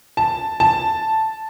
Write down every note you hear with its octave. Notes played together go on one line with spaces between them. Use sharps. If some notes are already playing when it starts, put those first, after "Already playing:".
A5
A5